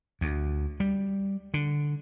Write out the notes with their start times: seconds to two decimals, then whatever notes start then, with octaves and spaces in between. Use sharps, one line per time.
0.21 D2
0.80 G3
1.54 D3